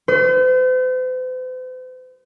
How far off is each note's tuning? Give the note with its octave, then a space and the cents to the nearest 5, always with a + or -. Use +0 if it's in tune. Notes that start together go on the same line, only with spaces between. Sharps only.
C5 -45